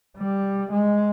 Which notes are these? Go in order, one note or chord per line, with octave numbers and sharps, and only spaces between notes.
G3
G#3